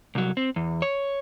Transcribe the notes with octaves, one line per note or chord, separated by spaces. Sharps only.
C2 F#3
C4
E2
C#5